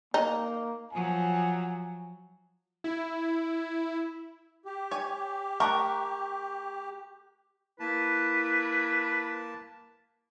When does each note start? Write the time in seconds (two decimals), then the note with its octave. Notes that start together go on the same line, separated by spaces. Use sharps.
0.14 A#3 D#4
0.93 F3 F#3 G#5
2.84 E4
4.65 G4
4.91 C#5 G#5
5.60 A3 A#4 G5 C#6 D6 F#6
7.80 A#3 E4 B4 A5